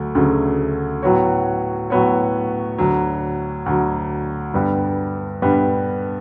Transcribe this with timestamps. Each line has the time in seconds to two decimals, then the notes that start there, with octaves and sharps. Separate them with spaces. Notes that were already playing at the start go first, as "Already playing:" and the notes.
Already playing: D2 F#3 A3
0.15 D2 C#3 F#3 A3
1.03 A2 F#3 B3 F#4 C#5
1.90 A2 F#3 B3 F#4 C#5
2.78 D2 D3 F#3
3.66 D2 D3 F#3
4.54 G2 D3 G3 B3
5.42 G2 D3 G3 B3